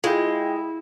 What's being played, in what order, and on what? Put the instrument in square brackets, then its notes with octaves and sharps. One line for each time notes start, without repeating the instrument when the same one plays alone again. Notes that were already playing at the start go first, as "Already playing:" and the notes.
[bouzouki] G#3 [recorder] E4 [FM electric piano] F4 G5